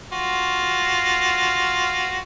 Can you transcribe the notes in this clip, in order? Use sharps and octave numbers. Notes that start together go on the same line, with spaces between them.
F4 F#4